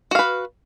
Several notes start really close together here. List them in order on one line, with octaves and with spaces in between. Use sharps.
F#4 F5 B4